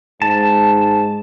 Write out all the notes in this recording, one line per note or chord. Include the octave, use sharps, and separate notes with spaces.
G#2 A5